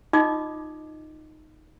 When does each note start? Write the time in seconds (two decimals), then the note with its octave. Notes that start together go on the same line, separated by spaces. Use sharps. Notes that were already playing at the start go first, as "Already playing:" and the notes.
0.13 D#4 F4 D#5 D6 D#6